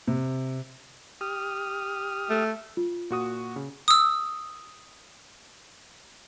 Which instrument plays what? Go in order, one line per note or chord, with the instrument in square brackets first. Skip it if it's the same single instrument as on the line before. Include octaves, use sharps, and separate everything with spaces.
[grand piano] C3
[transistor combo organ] G4 D#6 F6
[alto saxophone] A3
[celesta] F4
[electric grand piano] A#2 F#4 D#6
C#3
[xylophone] D#6 E6